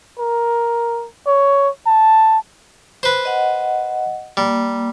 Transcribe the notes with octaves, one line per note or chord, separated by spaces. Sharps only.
A#4
C#5
A5
B4 C5
D#5 F#5
G3 A#3